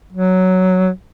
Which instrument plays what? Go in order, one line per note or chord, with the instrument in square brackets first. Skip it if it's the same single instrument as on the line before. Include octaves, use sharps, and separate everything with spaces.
[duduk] F#3